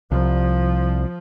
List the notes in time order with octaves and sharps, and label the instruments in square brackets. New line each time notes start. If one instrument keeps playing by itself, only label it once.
[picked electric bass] C2 [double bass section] F3